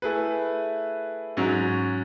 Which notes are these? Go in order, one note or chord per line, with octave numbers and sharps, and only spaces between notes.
A3 E4 G#4 B4
G#2 F#3 C#4